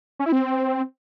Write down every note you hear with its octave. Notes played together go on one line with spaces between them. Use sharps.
C#4
E4
C4